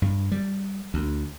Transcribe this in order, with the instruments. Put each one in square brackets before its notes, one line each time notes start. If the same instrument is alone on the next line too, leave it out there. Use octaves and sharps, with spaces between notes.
[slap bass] G2
G3
D2